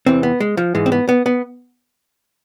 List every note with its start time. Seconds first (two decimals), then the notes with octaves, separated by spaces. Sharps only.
0.06 E2 C3 E3 C4
0.23 B3
0.40 G#3
0.57 F3
0.75 G#2 E3 G#3
0.86 C4
0.92 B3
1.09 B3
1.26 B3